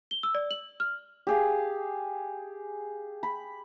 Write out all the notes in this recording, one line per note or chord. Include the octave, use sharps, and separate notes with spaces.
G7
E6
D5
F#7
F6
G4 G#4 F5
B5